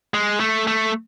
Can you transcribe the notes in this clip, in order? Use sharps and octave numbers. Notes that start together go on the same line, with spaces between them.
G#3
A3
A3